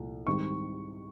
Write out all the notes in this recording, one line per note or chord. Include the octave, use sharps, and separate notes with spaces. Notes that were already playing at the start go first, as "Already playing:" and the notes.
Already playing: C2 A#2 F3 A3
G#2 D#3 G3 C4 C#6